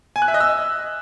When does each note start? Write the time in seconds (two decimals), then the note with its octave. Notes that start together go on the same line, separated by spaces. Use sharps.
0.16 G#5
0.22 F#6
0.28 E5
0.34 D#5
0.40 E6